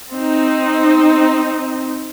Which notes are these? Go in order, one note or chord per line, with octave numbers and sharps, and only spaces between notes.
C4 D#4